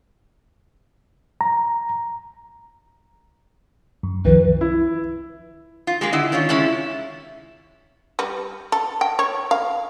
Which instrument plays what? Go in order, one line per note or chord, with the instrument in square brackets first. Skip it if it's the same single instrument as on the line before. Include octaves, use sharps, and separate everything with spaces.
[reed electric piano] A#5
[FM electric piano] F#2
[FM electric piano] C2 D#3 F3 [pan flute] B4
[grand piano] E4
[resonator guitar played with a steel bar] F4
G#3 A#3 G4 G#4
D3 E4 D#5
D#3 C#4 F4 C#5 D5
C3 G#3 C#4 E4
[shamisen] G3 B4
A4
G5
C#5
F5